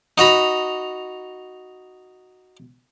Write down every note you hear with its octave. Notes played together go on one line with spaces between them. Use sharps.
D#4 F#4 A#5 B5